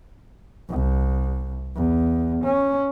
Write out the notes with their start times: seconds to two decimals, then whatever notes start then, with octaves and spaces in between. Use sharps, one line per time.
0.69 C2
1.76 E2
2.44 C#4